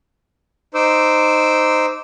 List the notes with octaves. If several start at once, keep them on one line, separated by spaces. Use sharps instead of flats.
D#4 C5 D6 E6